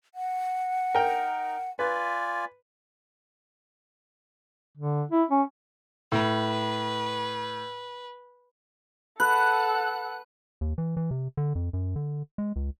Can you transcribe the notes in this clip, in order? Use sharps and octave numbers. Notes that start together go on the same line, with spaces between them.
F#5
D#4 A#4 G5
F4 B4 D5 G#5
D3
E4
C#4
A2 B4
A4 B4 F#5 F#6
D#2
E3
E3
C3
D3
F2
F#2
D3
G#3
C#2